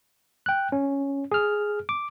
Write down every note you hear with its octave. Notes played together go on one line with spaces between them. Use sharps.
G5 F#6
C#4
G#4 F6
D6